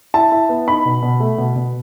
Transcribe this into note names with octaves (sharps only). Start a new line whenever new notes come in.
E4 A5
E4
B3
D#4 B5
B2
B2
A3
B2
B2